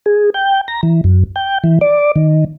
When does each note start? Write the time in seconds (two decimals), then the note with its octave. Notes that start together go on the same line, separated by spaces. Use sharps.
0.06 G#4
0.34 G5
0.68 A#5
0.83 E3
1.04 F#2
1.36 G5
1.64 E3
1.81 D5
2.16 D#3